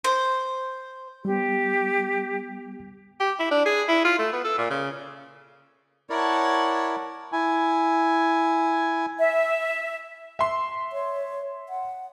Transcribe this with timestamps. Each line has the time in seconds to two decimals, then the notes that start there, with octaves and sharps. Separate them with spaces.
0.04 C5
1.25 G3 B3 G4
3.20 G4
3.39 E4
3.51 D4
3.65 G#4
3.88 E4
4.05 F4
4.19 A3
4.33 B3
4.45 A4
4.58 A#2
4.70 C#3
6.10 E4 A#4 C#5 D5 F#5 A5
7.32 E4 G#5
9.19 E5
10.39 E5 C6
10.92 C#5
11.69 F#5